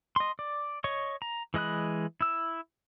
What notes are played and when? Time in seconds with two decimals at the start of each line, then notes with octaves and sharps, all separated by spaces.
0.16 D#5 C6
0.39 D5
0.84 C#5 D#5 C#6
1.22 A#5
1.54 E3 G#3 D#5 B5 F#6
2.21 E4 E6